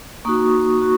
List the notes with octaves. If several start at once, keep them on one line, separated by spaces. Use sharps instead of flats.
A#3 D#4 F#4 C#6 D#6
F#4 C#6